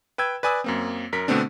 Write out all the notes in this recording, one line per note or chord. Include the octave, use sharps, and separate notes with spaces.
B4 G5 E6 G#6
B4 D5 G#5 D#6 E6
F#2 A#3 C4
F#2 A#4 B6
B2 D3 A3 B3 C4 D4